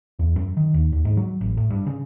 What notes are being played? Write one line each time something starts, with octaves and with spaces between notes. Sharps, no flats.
E2
F#2
D#3
D#2
D#2
G#2
F#3
A1
A2
G2
C#3